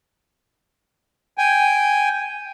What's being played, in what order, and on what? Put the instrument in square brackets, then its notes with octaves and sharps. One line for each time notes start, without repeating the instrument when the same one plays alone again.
[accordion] G5 G#5